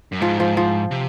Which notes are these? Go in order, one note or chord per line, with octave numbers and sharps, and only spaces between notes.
F#2
G#2 F3
F3
F3
C3